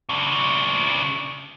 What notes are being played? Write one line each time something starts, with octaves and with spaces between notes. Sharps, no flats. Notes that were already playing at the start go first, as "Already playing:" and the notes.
C#3 D4